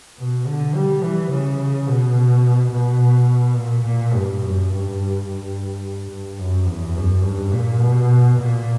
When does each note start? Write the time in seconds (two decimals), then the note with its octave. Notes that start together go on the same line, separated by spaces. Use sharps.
0.18 B2
0.46 D3
0.75 G3
1.03 E3
1.31 C#3
1.87 B2
2.72 B2
3.57 A#2
3.86 A#2
4.14 G2
4.42 F#2
4.70 G2
5.26 G2
6.11 G2
6.39 F#2
6.68 E2
6.96 F#2
7.24 G2
7.52 A#2
7.81 B2
8.37 A#2